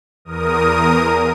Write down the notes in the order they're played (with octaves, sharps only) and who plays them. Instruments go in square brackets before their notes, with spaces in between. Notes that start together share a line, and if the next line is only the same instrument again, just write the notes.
[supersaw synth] E2 A#4 D#6